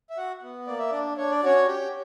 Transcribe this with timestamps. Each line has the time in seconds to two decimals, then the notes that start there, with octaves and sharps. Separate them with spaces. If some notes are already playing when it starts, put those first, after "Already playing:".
0.10 E5
0.17 F#4 F#5
0.43 B3
0.67 A#3 D5
0.79 E5
0.91 D4 D5
1.17 D4 C#5
1.31 D5
1.43 C#4 F#4 C#5
1.67 G4